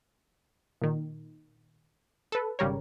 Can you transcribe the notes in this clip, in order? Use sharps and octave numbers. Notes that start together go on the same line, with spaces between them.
A#2 D#3
A4 B4
G#1 C#3 G3 A#4 C#5